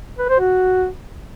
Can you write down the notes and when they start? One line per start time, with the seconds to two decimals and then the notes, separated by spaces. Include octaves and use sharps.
0.18 B4
0.29 C5
0.40 F#4